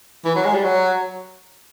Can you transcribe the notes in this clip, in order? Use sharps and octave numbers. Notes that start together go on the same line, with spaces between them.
E3
F#3
G#3
G3
F#3